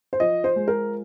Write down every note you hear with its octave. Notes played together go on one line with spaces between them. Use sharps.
C5
F3 D#5
C5
G#3
A#4